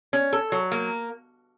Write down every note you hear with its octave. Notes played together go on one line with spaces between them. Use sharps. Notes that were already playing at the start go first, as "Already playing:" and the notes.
C#4
A4
F#3
A#3